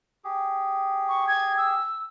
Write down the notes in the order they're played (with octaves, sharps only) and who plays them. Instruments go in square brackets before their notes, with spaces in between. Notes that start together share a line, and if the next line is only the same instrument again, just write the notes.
[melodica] G4 G#4
[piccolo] C#6
G#6
E6